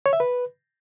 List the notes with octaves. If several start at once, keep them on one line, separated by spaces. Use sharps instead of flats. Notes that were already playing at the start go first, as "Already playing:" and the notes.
C#5
E5
B4